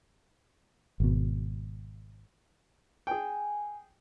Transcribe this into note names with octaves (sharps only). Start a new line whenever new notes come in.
G#1 B2
G#4 G5 G#5